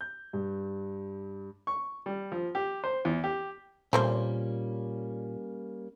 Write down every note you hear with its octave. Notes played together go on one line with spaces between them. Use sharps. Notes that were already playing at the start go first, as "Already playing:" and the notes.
G6
G2
C#6
G3
F3
G4
C5
E2
G4
A#2 G3 A3 A#3 C4 C#4 C5